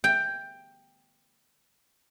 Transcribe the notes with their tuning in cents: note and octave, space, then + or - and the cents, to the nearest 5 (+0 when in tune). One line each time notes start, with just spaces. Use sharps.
G5 +10